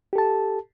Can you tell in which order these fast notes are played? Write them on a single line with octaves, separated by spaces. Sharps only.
G4 A4 A5